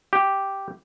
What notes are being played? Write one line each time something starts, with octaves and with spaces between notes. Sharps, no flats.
G4